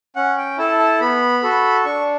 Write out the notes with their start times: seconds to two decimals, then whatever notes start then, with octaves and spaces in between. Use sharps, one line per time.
0.16 C#4 F#5
0.38 G5
0.58 E4 A4 A5
0.79 A5
1.00 B3 B5
1.43 F#4 A4
1.85 D4 C#6